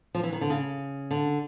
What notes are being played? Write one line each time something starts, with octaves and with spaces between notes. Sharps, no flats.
F3
E3
D#3
D3
C#3
D3